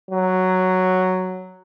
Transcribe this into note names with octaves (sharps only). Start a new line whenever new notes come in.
F#3